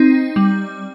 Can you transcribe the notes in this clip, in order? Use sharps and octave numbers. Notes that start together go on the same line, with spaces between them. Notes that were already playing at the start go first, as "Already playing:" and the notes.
Already playing: C4 D#4
G3